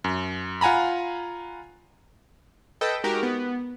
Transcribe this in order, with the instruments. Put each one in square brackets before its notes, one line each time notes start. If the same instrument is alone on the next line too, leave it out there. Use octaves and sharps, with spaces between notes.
[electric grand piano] F#2
F4 F#5 G#5 A#5 B5
[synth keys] A4 B4 D#5 G5 A5 B5
G#3 D#4 F#4 G4 A#4
B3